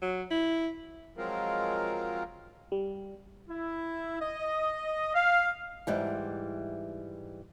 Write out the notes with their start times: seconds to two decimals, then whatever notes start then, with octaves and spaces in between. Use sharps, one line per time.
0.02 F#3
0.31 E4
1.17 F3 F#3 G#3 C4 F4 A#4
2.72 G3
3.49 E4
4.21 D#5
5.14 F5
5.87 G#2 E3 G3